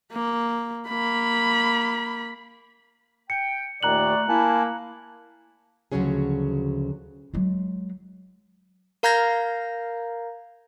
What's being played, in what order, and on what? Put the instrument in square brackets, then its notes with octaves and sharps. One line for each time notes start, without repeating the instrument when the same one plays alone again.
[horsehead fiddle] A#3
A#3 B5
[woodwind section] G5 [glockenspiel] C#7
[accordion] D#2 A#2 D#3 [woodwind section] A3 [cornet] D5 [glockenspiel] A#5 F#6 F#7
[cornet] A#3 [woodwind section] E4 [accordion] G#5 A5
[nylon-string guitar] D2 C#3 F3 F#3 C#4 G#4
[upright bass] F#3 G#3
[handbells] A#4 F5 A#5 G6 G#6 A#6